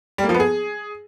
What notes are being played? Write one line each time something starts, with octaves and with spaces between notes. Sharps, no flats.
G3
A#3
F3
B3
G#4